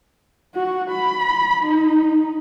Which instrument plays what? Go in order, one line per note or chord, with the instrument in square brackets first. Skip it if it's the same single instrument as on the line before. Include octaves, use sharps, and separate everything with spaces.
[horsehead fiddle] F#4
B5
D#4